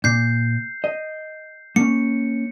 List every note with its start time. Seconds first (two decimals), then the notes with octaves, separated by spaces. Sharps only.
0.04 A#2 G6 C7
0.84 D#5
1.76 A#3 C#4 C#7